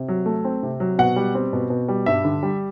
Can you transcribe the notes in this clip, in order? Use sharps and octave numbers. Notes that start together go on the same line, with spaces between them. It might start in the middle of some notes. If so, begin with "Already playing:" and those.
Already playing: C3
F#3
A3
C4
C3
F#3
B2 F#5
G3
C4
B2
B2
G3
G2 E5
D3
G3